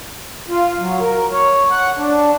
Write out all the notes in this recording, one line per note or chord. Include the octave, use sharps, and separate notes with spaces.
F4
F#3
A#4
C#5
F#5
D4